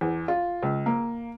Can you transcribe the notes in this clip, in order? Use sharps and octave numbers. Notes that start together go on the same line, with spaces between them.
E2
F4
C#2
A#3